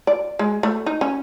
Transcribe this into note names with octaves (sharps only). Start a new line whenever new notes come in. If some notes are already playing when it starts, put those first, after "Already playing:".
D5
G#3
A3
D#4
C#4